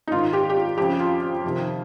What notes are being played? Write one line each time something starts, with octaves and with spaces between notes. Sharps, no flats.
D#4
G#2 D#3 F4
G4
G4
F4
F2 C#3 G4
F4
F4
F2 C3 D#3